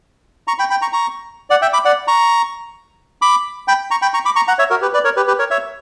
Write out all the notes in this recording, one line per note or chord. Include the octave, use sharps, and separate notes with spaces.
A#5 C#6
G5 B5
G5 B5
A#5 C#6
A#5 C#6
D5 F#5
E5 G5
B5 D6
D5 F#5
A#5 C#6
B5 D6
G5 B5
A#5 C#6
G5 B5
A#5 C#6
B5 D6
A#5 C#6
F#5 A#5
C#5 E5
F#4 A#4
G4 B4
B4 D5
A#4 C#5
G4 B4
G4 B4
A#4 C#5
C#5 E5